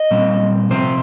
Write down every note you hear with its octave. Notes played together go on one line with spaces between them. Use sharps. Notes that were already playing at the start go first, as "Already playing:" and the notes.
Already playing: D#5
A#2 G3 C4
C3 F3 C4 C5